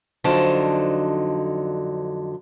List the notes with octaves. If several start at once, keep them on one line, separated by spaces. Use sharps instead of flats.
F2 D3 F#3 D#4 C5 A5